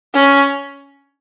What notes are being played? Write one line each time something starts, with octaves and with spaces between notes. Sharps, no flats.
C#4